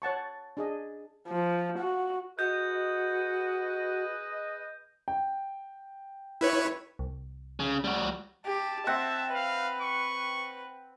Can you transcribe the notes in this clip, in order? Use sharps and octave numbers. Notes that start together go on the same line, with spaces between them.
C#5 F#5 A5 C#6
D4 G#4 D#5
F3
F#4
F#4 G#4 B4 D#5 G6
G5
E4 B4 C#5
C2
C#3
G3 F#4
G4 A5
C4 E5 F#5
B4 F5
C#6